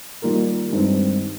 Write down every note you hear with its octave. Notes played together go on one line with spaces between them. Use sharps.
D#3 G3 A#3 F4 A#4
G2 D#3 G#3 C4